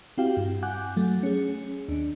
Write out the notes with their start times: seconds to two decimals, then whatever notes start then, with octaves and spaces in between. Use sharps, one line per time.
0.17 C4 E4 F#4 G4 F5 G5
0.37 G2
0.63 F#5 G#5 D6 F#6 G6
0.96 F#3 A3
1.23 C#4 G#4
1.88 D#2 D4